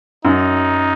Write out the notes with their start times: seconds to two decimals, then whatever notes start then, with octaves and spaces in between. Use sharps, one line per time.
0.25 F#2 D#4